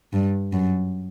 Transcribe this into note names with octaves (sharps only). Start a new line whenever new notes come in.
G2
F#2